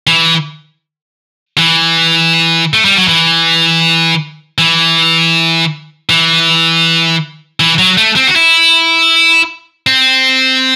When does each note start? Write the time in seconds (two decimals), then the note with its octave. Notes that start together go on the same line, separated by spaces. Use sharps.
0.07 E3
1.58 E3
2.73 A3
2.85 G3
2.97 F#3
3.08 E3
4.58 E3
6.10 E3
7.60 E3
7.79 F#3
7.97 A3
8.16 C4
8.27 F#4
8.36 E4
9.87 C4